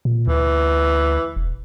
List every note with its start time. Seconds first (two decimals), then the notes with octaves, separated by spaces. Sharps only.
0.05 A#2
0.28 D2 E3
1.36 E1